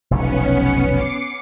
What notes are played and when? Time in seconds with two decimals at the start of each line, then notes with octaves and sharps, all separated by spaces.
0.11 F1 B1 D#3 B3 C#4 C#7
0.93 D6 C7 C#7